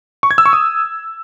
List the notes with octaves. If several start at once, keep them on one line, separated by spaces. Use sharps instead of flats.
C#6
G#6
E6
C#6
D#6